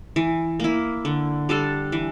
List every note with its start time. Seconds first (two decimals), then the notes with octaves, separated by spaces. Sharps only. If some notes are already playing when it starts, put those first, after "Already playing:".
0.16 E3
0.60 A#3 E4
1.05 D3
1.49 G3 D4 A4
1.92 E3